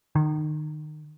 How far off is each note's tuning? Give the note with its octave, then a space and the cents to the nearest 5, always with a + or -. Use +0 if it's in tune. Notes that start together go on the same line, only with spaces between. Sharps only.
D#3 -30